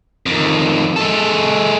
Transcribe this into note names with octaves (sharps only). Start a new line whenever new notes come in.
F2 D#3
G#3 A4